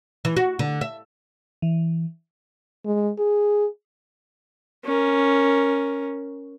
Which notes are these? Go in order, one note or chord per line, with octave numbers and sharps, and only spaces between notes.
E3
F#4
D3
E5
E3
G#3
G#4
C#4 A#4